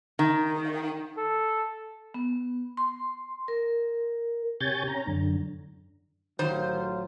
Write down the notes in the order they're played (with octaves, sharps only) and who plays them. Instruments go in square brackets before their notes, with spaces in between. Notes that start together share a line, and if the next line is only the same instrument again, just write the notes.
[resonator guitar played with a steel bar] D#3
[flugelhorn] A4
[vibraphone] B3
C6
A#4
[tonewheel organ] C3 G4 C#5 G#5 G6 A6
C#4 A#5
F#2 D3
[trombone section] A1 F#3 F4 [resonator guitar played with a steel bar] D#3 C5